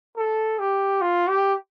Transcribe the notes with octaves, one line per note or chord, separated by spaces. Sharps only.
A4
G4
F4
G4